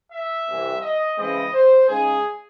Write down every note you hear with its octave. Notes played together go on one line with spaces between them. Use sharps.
E5
C2 C3 E3
D#5
C#3 E3 G#3 C4 E4 D#5
C5
C#3 G#3 D#4 G#4